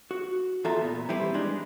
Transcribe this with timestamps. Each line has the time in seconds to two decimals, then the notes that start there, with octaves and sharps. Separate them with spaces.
0.11 F#4
0.65 E2 F4 A4 E5 A#5
0.82 A#2 B3
1.09 E3 G3 C4 E4 G4 B4
1.34 G#3 D4 D#4